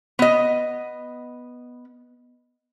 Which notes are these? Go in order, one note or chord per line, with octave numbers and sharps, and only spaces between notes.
B3 D#5